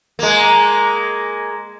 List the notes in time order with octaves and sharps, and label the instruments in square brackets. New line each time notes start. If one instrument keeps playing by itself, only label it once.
[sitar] G#3 A#3